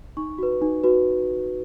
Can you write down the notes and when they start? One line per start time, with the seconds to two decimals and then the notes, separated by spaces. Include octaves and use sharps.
0.17 D#4 C#6
0.38 F#4 B4
0.62 D#4
0.84 F#4 B4